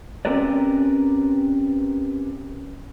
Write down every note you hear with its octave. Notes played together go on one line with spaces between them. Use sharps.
C4 C#4 G4 A#4 B4 D5